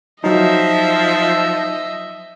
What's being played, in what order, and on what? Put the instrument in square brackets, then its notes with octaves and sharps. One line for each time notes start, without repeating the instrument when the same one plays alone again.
[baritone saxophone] F3 [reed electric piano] F#3 D#4 [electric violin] D#5 E5